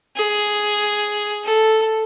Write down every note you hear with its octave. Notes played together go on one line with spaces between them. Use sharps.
G#4
A4